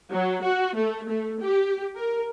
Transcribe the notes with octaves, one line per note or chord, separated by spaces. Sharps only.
F#3
F#4
A3
A3
G4
A#4